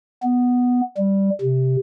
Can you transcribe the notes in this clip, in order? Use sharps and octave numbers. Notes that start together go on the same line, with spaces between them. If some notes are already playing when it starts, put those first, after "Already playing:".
B3
G3
C3